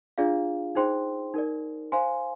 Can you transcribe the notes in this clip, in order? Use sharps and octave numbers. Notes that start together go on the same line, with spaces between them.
D4 F4 G#4 D5 F5
D#4 G#4 C5 G5 C6
D#4 A#4 D5
C5 F5 G#5 C6